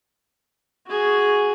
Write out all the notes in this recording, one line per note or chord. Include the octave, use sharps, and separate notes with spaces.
F#4 G#4